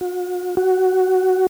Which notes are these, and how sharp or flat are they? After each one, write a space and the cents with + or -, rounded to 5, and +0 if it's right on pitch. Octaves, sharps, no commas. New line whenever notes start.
F#4 -45
F#4 +10